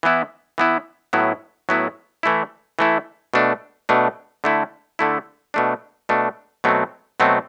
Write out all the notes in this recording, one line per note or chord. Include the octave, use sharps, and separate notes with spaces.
E3 B3 E4
E3 B3 E4
A2 F#3 B3 E4
A2 F#3 B3 E4
E3 A3 E4
E3 A3 E4
B2 A3 D4
B2 A3 D4
D3 A3 E4
D3 A3 E4
B2 A3 D4
B2 A3 D4
B2 F#3 A3 C4
B2 F#3 A3 C4